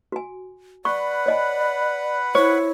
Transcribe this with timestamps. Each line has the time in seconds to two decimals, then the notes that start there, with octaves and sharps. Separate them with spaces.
0.12 F#4 G#5
0.85 B4 D5 F#5 B5 C#6
1.26 C#5 D#5 G#5
2.35 E4 C5 C#5